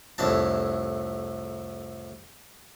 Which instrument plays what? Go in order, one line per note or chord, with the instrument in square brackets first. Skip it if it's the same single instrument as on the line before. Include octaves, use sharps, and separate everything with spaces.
[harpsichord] C2 F2 A2 D4 A5